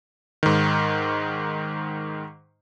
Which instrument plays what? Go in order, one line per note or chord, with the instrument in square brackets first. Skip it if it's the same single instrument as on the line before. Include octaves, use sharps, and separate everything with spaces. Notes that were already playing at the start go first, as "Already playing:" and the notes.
[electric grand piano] G#2 D#3